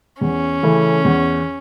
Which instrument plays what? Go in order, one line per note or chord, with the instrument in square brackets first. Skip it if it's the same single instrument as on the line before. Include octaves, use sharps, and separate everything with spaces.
[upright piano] E2 [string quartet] C#4
[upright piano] C#3 E3 A3
E2